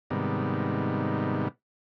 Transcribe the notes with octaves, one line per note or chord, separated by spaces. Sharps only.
G#2 C3 D#3 G3 B3